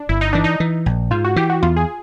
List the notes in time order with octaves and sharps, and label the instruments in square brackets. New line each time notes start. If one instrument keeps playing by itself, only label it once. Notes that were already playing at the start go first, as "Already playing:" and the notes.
Already playing: [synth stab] D4
[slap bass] G1 [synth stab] E4
[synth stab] D#4
[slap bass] E3 [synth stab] D4
[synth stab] D#4
[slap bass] E3
A#1
[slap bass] G#2 [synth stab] F4
[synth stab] F#4
[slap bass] E3 [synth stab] G4
[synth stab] F#4
[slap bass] E2 [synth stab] F4
[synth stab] G#4